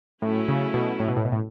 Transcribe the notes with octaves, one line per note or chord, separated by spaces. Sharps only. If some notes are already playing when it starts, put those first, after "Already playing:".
A2 F#3 A3 C#4 E4 A4
C#3
B2
A2
B2
A2
B2
A2